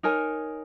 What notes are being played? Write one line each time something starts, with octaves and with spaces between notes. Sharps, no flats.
D#4 A#4 C#5 G#5